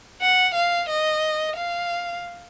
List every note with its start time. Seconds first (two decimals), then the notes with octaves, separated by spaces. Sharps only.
0.22 F#5
0.54 F5
0.89 D#5
1.56 F5